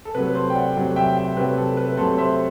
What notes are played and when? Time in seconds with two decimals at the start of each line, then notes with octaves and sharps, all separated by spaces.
0.05 A4
0.15 C3 F#3 A3 B4
0.35 A4 C5
0.50 G5
0.55 D5 F#5
0.76 C3 F#3 A3
0.96 E5 G5
1.17 E5 G5
1.37 C3 F#3 A3 B4
1.58 A4
1.77 B4
1.97 C3 F#3 A3 A4 C5
2.18 C5 E5